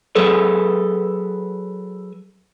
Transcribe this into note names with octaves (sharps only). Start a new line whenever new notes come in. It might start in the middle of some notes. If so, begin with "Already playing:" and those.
F#3 G#4 A4 B4